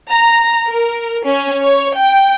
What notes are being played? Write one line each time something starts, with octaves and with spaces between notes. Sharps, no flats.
A#5
A#4
C#4
C#5
G5